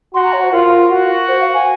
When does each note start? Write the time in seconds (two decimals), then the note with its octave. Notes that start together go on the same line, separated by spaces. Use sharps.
0.14 F#4 C6
0.23 A#5
0.32 C#5
0.43 C5
0.51 F4 A#4
0.91 F#4
1.28 C5
1.40 F5
1.54 G#5